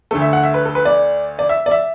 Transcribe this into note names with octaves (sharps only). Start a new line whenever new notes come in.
D2 D3 A3 A4
E5
F#5
E5
B4
A4
B4
D5
D5
E5
D5
E5